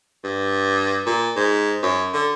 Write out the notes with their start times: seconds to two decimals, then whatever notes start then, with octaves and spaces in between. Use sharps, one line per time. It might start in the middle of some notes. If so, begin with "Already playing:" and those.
0.24 G2
1.06 A#2
1.36 G#2
1.82 F#2
2.14 D3